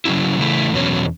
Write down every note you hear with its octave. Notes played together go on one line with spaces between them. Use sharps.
C#3 F#3 C#4 E4
C#3 E3 A3 E4
E2 B2 F#3 C#4